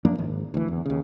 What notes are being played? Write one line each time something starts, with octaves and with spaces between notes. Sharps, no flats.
F#2 F3 A#3 D4
G#1
D2 E3
E2
D#2 C#3